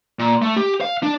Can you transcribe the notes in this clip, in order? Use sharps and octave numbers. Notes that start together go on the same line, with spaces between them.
A#2
A3
G4
F5
D4